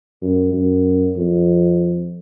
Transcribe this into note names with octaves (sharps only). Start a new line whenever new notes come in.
F#2
F#2
F2